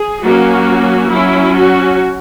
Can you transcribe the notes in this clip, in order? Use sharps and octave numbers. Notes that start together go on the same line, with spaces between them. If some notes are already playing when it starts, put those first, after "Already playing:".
Already playing: G#4
F#3 A#3 C#4 F#4
F#3 C#4 E4
F#4